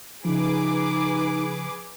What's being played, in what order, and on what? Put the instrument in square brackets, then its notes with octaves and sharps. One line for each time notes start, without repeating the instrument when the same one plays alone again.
[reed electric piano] C#3 F3 [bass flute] D#4 [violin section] G#4 B4 D6